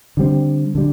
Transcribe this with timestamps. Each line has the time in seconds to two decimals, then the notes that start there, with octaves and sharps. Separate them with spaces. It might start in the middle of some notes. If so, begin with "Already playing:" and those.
0.17 D3 G3 C4
0.75 D3 G3